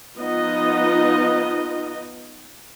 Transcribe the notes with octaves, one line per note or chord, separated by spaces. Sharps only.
F3 B3 D#4 F4 D#5